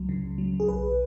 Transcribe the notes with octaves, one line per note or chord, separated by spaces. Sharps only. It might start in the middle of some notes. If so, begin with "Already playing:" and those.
Already playing: C#2 F#3
C#3
C#2
F#3
C#2
G#4
B1 B4